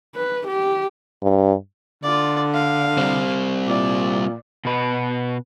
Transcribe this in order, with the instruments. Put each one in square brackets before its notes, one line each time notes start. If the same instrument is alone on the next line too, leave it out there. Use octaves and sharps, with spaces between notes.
[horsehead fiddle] B4
G4
[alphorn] G2
[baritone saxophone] D3 [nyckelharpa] F4 D5
[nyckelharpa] F5
[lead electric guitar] G3 C4
[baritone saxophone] A#2 [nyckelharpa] D5
[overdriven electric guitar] B2 B4